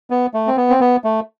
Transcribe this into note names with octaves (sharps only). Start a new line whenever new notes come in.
B3
A3
C4
B3
C4
B3
A3